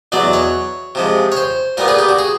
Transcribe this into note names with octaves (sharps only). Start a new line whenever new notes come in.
E2 B2 F#3 D5
C#5
C3 F3 G#3
C#5
C5
A#2 G3 B3 A#4
G#4
G4
F#4
G#4